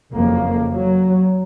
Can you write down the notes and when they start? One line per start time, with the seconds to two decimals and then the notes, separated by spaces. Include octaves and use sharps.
0.13 F#1 F2 A#3
0.72 F#3